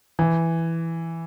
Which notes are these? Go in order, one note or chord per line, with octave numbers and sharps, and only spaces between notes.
E3